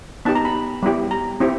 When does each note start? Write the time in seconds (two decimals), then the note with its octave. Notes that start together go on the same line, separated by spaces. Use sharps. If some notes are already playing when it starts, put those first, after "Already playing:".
0.25 B3 D#4 G4 A5
0.35 A#5
0.45 B5
0.83 G3 B3 E4 G4
1.11 A#5
1.40 C4 E4 G4